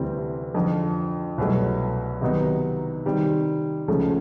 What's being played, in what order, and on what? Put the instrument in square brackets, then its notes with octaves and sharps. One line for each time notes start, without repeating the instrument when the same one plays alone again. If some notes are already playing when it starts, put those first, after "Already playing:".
Already playing: [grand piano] D2 C3 E3 G3 C4
F2 D3 F3
C2 B2 F#3 A3
C3 D#3 F#3 B3 D#4
C3 D#3 G3 C4
C#2 C#3 F3 A3 C#4